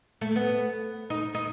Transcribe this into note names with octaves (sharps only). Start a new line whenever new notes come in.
A3
B3
D#4
D#4